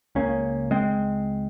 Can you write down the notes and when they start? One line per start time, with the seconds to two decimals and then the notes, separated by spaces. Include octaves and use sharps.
0.15 C#2 C#3 A#3 C#4
0.71 G#3 C4